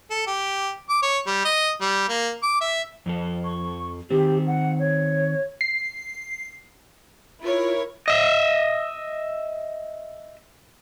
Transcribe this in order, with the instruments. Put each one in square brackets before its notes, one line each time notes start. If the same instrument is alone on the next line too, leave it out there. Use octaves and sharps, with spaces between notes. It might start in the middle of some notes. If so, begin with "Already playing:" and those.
[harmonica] A4
G4
D6
C#5
G3
D#5
G3
A#3
D6
E5
[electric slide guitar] F2 F3 A4
[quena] C#6
[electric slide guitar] D#3 C4 [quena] G4
[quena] F#5
C#5
[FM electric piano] C7
[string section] E4 A#4 C#5 [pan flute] F4
[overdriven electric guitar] D#5 E5